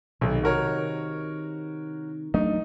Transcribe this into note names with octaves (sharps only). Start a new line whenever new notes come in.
B1 C3 D#3
F#4 A#4 C#5
F#3 A3 D4 D#4